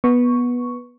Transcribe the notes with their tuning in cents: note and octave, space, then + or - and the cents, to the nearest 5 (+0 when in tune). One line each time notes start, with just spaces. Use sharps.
B3 -15 C#6 +0